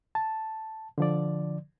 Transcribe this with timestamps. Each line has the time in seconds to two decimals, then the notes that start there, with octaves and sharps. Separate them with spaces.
0.15 A5
0.98 D3 F3 D5